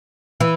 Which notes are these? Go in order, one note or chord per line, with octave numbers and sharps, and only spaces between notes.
E3